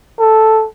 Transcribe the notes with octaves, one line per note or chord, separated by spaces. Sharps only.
A4